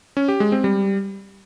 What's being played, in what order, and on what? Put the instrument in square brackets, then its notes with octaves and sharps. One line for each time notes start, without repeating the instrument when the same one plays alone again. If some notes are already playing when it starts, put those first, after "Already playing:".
[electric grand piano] C#4
G4
G#3
C4
G3